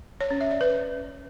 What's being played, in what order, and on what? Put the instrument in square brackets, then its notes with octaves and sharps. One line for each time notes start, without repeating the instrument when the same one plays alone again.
[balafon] C#5
C#4
E5
D5
B4